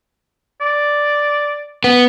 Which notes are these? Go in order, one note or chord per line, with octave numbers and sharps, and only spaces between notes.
D5
B3